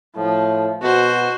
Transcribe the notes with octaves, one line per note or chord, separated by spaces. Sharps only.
A2 F3
B2 F#4 C5